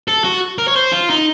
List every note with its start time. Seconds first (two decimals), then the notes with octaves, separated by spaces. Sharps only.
0.08 A4
0.24 F#4
0.58 A#4
0.68 C#5
0.76 C5
0.92 F4
1.10 D#4